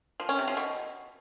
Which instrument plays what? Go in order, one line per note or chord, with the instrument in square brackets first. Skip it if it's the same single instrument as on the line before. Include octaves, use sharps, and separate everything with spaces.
[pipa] F3
C#4
C3
F3
B2